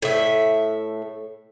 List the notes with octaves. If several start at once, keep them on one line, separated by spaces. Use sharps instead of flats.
A2 E5